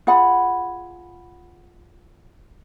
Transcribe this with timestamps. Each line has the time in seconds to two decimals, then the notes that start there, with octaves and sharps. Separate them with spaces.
0.07 F4 G#4 F#5 B5